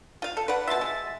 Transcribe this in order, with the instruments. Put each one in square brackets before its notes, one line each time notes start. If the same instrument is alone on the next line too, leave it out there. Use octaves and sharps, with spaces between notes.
[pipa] F4 F5
A4
B4 D5 F#5
[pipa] B2 F4 [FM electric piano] E5 A6
[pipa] G#3